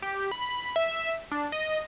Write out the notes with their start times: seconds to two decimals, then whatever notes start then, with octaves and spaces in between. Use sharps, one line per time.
0.02 G4
0.31 B5
0.49 B5
0.76 E5
1.32 D4
1.52 D#5